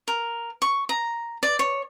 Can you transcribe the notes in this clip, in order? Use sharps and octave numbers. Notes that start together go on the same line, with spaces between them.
A#4
C#6
A#5
D5
C#5